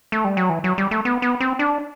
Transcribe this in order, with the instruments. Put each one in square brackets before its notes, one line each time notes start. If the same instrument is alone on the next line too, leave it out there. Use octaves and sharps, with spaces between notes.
[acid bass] A3
G3
F#3
E3
F#3
G3
A3
B3
B3
C4
D4